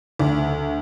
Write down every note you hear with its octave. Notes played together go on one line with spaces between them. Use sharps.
D2